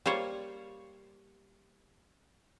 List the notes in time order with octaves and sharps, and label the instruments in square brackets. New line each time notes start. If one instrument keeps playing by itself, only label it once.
[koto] G3 A#3 F4 C5 C#5